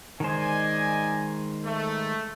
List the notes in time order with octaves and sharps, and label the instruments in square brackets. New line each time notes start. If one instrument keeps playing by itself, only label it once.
[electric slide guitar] D#3 G#3 C5 [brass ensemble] D5 D#5 G#5
[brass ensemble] A3